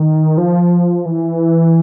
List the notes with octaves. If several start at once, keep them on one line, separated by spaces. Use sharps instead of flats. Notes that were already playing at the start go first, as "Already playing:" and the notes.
Already playing: D#3
F3
E3